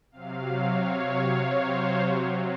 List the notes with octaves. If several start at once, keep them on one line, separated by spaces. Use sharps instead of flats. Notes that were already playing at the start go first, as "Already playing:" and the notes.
C3 F#3 F5
C#5
C5
C3 F#3